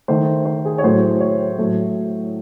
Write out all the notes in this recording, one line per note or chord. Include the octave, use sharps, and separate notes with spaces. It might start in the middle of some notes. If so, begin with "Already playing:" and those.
D#3 A3 C5
C5
G#4
C#5
A2 F#3 A3 C5
C#5
A2 F#3 A3